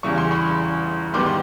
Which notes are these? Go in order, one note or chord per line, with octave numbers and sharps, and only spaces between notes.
E2 C#3 E3 G3 C#6
C6
B5 C#6
G#2 D#3 G3 B3 C6 D6
C6